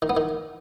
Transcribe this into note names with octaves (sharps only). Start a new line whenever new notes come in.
D#3
B3
D#3